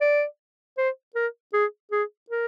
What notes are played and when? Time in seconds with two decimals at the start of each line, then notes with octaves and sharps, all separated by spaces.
0.01 D5
0.78 C5
1.15 A#4
1.54 G#4
1.91 G#4
2.30 A#4